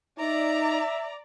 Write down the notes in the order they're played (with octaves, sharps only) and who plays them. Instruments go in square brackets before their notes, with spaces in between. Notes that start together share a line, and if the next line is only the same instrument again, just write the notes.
[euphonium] D#4 [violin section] D5 [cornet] E5 [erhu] A#5